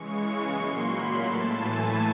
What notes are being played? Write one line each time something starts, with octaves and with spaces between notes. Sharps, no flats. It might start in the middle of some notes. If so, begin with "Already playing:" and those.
Already playing: C#3 E3 G#3 C#6
A#2 F#3 A#3 C6
B5
A2 E3 A3 A5
G#5